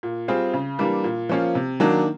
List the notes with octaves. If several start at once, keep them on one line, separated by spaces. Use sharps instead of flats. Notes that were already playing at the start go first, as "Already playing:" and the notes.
A#2
G3 C4 F4 G#4
C#3
E3 G3 A#3 D4
A#2
F3 A#3 C#4 F4
C3
D#3 F#3 A#3 D4